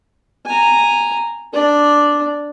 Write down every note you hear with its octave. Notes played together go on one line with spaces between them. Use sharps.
G#5 A#5
D4 D5